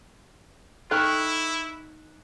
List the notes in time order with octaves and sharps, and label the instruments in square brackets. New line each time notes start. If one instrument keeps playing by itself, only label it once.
[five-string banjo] D#4 A4 G5 [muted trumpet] E4 [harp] C#6 F6 F#6